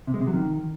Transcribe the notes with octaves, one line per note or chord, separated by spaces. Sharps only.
C3
G#3
C3
F#3
D#3